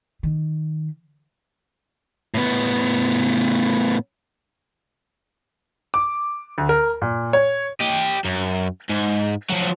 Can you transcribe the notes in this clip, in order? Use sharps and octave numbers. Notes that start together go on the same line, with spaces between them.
D#3
A2 B3
D6
D2
A#4
A#2
C#5
G4 D#5
F#2
G#2
F3 F#3